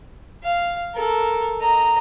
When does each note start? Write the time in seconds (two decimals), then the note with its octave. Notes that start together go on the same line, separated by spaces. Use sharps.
0.43 F5
0.95 A4 A#4
1.60 D#5 A#5